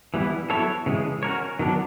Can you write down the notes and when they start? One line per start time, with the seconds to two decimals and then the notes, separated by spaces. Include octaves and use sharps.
0.14 E3 G3 B3 E4
0.50 F#3 B3 E4 A4 C#5
0.86 C#3 E3 G#3
1.23 C#4 F#4 A#4 C#5
1.59 D#3 F#3 B3 D4